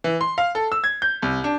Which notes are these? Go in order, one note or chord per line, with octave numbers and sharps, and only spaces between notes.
E3
C6
F5
A4
E6
G#6
G6
C2
D4